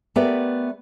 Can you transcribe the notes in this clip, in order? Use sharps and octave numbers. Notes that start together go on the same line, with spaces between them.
A3 B3 G4 A#4 B4 D5